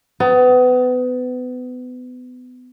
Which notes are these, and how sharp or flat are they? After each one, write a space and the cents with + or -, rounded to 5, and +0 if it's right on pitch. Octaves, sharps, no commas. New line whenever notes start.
B3 +30